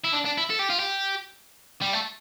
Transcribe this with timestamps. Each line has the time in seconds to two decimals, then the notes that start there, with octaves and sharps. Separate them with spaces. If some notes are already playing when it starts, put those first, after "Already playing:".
0.05 E4
0.13 D4
0.26 D4
0.38 E4
0.50 A4
0.59 G4
0.69 F4
0.79 G4
1.81 G3
1.93 A3